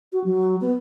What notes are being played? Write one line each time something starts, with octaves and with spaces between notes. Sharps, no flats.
F#4
F#3
B3